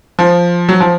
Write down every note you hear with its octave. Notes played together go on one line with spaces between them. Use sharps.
F3
F#3
F3